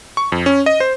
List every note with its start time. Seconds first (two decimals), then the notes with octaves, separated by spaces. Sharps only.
0.17 C#6
0.32 F2
0.46 C#4
0.66 D#5
0.80 C5